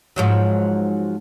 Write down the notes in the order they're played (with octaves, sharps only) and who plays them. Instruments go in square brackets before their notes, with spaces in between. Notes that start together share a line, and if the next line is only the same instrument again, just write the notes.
[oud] G#2 F3 F#3